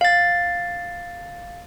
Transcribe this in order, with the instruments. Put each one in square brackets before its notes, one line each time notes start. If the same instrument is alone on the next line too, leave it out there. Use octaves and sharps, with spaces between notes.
[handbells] F5 A6